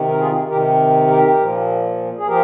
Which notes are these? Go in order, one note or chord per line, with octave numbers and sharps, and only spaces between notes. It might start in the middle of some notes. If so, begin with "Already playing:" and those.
Already playing: C3 D#3
A#4
F4 G#4
C3 D#3 G4 A#4
G4 A#4
A#2 F3
G#4
F3 G4 A#4